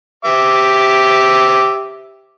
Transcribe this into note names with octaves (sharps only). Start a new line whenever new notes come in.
G4 E5 D6